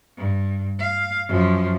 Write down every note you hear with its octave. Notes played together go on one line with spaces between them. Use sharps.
G2
F5
F#2 F3